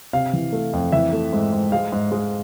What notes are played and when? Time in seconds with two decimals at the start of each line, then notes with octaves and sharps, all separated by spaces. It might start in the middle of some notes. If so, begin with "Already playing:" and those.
0.13 C3 F5
0.33 E3
0.53 A3
0.73 F2
0.92 E3 E5
1.13 A3
1.33 G#2
1.52 G#2
1.72 G#3 F5
1.92 G#2
2.12 G#3